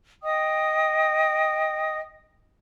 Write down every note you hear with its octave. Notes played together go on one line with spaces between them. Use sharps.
D#5 G5 D#6